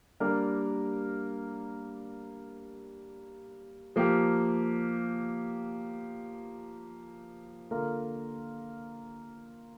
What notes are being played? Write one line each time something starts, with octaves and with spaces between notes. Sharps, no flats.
G3 A#3 D4 A#4
F3 A#3 G4
D3 A#3 F4 A#4